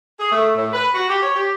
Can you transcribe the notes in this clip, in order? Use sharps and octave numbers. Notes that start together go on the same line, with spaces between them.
G#4
A3
A2
B4
F#4
G4
C#5
G4